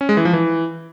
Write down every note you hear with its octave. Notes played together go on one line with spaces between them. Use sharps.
C#4
G#3
E3
F3
E3